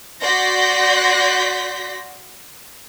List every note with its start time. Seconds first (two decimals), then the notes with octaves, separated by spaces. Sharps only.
0.23 F#4 D5 C6 G6 A#6 B6